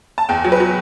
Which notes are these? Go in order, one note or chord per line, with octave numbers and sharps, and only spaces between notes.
A5
E2 G5
F#3
B4
F#3